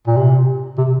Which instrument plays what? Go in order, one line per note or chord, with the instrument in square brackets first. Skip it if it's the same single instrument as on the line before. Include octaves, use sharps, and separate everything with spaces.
[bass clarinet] A#2
C3
C3